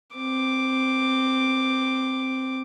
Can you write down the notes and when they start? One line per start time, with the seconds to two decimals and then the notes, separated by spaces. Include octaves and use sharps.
0.15 C4 D6